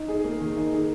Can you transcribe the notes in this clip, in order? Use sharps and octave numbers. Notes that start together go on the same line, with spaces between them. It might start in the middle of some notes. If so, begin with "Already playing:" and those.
Already playing: D#4
G#4
A#3
D#3
D#4
G#4